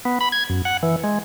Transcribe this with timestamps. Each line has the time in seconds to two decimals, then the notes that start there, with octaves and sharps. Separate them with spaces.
0.05 B3
0.21 B5
0.32 G#6
0.50 F#2
0.65 F#5
0.83 E3
1.04 G#3